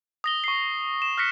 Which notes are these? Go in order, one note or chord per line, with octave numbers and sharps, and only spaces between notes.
D#6 A#6 G7
C#6 C7
E7
F6 F#6 A#6 B6 C#7